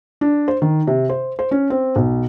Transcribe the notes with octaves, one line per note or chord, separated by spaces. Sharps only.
D4
C5
D#3
C3
C5
C5
C#4
C4
B1